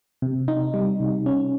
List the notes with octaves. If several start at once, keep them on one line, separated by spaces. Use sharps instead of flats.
C3
D#4
G3
C3
C#4